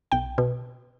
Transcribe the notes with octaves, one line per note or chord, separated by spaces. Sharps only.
B1 G5
B2